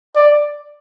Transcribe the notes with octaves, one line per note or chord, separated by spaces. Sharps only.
D5